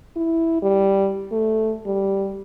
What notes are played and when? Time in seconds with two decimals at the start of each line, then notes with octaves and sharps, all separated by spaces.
0.16 E4
0.62 G3
1.32 A3
1.86 G3